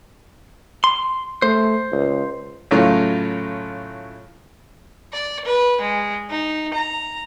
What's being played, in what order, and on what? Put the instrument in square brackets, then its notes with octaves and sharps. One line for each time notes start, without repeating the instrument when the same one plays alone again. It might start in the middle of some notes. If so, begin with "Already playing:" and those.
[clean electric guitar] C6
[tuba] A3 [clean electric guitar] C5
[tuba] C#2
[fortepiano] A2 C#3 F#3 A3 F4
[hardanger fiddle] D5
B4
G#3
D#4
A#5